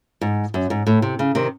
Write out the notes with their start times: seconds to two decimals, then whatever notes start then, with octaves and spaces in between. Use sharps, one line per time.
0.21 G#2
0.54 F#2
0.70 G#2
0.87 A2
1.02 C3
1.19 C#3
1.35 C3 D#3